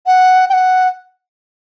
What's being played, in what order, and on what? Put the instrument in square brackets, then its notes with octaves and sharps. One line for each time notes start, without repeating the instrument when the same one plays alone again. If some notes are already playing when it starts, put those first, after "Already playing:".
[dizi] F#5
G5
F#5